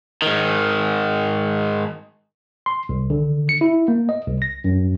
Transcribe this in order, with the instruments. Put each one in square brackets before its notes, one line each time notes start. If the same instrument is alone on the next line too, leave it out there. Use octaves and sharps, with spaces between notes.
[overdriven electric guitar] G#2 D#3
[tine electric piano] C6
C2
D3
C#7
E4
A#3
D#5
C2
A#6
F#2